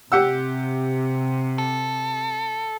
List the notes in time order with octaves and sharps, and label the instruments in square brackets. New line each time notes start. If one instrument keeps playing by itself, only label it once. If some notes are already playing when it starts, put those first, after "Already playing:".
[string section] C3 [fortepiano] G4 F#5 E6
[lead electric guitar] A4